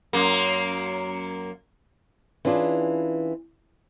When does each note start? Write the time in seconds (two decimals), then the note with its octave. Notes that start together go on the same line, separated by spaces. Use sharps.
0.13 F#2 A#3
2.45 E3 C#4 D4 F4 G#4